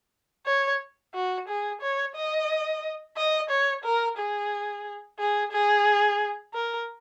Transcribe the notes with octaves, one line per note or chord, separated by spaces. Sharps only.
C#5
F#4
G#4
C#5
D#5
D#5
C#5
A#4
G#4
G#4
G#4
A#4